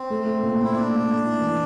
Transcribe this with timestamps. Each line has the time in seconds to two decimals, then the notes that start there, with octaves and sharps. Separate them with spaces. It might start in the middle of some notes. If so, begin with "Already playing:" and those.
Already playing: C4
0.10 A3
0.26 A3
0.43 A#2
0.59 A#2
0.65 E4
0.75 A#2 D4
0.92 A3
1.09 A3
1.25 E4
1.41 E3